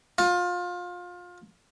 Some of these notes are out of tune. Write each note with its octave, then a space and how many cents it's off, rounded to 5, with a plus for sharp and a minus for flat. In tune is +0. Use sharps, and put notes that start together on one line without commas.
F4 +25